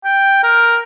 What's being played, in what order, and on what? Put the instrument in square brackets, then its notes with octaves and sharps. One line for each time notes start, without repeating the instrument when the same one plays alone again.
[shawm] G5
A#4